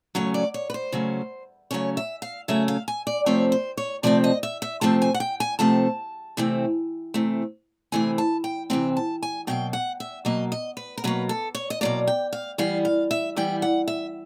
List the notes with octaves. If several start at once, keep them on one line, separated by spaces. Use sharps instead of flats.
C#3 F#3 A3 C#4 C#5
D5
C#5
B4
C5
C#3 F#3 A3 C#4
C#3 F#3 A3 C#4 C#5
E5
F5
C#3 F#3 A3 C#4 E5
F5
G#5
D5
C3 F3 A3 C4 C#5
C5
C#5
C3 F3 A3 C4 D5
D#5
E5
E5
C3 F3 A3 C4 A5
G#5
F#5
G5
G#5
C3 F3 A3 C4 A5
C3 E3 A3 C4
C3 E3 A3 C4
C3 E3 A3 C4 G#5
A5
G5
C3 E3 A3 C4 G5
A5
G#5
B2 F#3 A#3 G5
F#5
E5
B2 F#3 A#3 D#5
D#5
B4
A#4
B2 F#3 A#3 B4
A4
C#5
D#5
B2 F#3 A#3 D5
G5
F5
E3 G3 B3 F5
F5
E5
E3 G3 B3 G5
F#5
E5